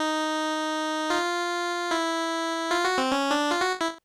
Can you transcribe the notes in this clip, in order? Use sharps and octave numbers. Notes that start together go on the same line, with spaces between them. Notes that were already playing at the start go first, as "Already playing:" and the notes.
Already playing: D#4
F4
E4
F4
F#4
C4
C#4
D4
F4
F#4
E4